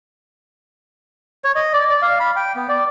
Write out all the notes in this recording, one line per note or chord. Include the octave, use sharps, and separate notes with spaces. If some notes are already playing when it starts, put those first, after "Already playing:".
C#5
D#5
D5
D5
F5
B5
G5
B3
D5